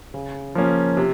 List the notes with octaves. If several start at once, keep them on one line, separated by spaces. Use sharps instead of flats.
C#3
F3 A#3 C#4
C3